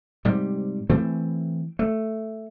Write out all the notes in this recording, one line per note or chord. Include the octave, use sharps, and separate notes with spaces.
G#2 C3 G3
E3 A3 C4
A3